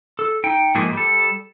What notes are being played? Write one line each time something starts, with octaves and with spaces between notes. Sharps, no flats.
A4
D#4 G5
G#2 F3 A3 A#3 D#4 G#4
G3 A4